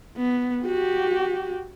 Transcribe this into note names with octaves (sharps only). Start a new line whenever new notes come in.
B3
F#4 G4